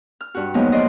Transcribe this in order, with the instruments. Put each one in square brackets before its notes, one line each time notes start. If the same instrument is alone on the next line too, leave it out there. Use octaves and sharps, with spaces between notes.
[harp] F6
G2 F#4
F3 F#3 G#3 A#3 B3 D#4
D5 D#5 C6